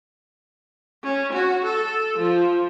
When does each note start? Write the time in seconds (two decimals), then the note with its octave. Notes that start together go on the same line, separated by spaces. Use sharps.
1.03 C#4
1.33 F#4
1.65 A4
2.18 F3